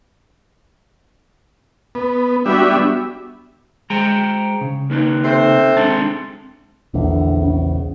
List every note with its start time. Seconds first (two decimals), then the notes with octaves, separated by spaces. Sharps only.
1.95 B3
2.46 G3 B3 D4 F#4 E5
3.90 G#3 C5 G5 A#5
4.61 C#3
4.90 A#3 D#4 B4
5.24 C3 A3 C5
5.77 G#3 C4 D4 A5 C6
6.94 A#1 E2 D3
7.41 C#3